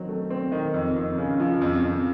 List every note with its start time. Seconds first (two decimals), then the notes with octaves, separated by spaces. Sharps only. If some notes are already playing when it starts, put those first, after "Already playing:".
Already playing: D#3 F#3 C4
0.09 A3
0.30 C4
0.52 D#3
0.74 F2
0.96 F2
1.18 C#3
1.40 F3
1.61 F2
1.83 F2